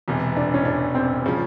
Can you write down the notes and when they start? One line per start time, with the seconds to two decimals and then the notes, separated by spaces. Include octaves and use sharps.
0.08 E1 E2 C3
0.37 D4
0.54 C#4
0.65 D4
0.95 C4
1.26 C#3 F3